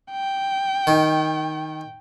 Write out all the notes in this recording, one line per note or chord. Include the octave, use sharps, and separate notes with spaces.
G5
D#3